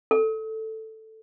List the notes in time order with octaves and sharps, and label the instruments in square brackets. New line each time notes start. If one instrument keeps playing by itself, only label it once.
[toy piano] A4